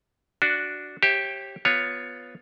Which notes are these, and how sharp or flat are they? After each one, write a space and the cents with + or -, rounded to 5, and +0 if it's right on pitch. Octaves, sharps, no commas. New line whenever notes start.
D4 +0 F#4 +0
G4 +0 C#5 -45 E5 +0
B3 +0 F4 +15 C#5 +5